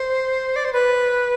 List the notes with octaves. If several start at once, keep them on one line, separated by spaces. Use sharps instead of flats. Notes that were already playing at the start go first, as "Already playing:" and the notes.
Already playing: C5
D5
C5
B4